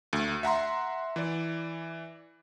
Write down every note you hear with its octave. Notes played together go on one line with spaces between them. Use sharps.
D2
E5 F#5 A#5 C6
E3 D5